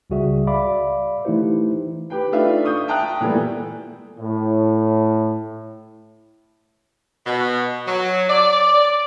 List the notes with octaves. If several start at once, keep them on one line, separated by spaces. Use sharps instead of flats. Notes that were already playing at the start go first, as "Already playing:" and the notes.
C#2 C#3 G3 F#4 G#4 E5
D5 E5 F5 B5 D6
E3 A3 D#4 E4 G4 C5
G4 B4 G5
A3 D4 D#4 F4 B4 E5
C#6 D#6 G6
E5 G5 A5 A#5 D#6 F#6
A#2 E3 G3 A3 B3
A2
B2
F#3
D5